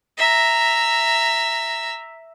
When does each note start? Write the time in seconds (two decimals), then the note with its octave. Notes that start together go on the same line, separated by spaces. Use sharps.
0.18 E5 A#5